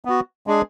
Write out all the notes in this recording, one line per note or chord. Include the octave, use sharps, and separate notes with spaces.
B3 F#4
G#3 D4 G#4